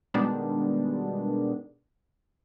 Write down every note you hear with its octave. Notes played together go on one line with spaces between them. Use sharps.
B2 D#3 G3 G#3 B3 D4